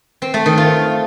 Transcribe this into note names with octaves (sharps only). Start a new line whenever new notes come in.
C4
A3
D#3
F4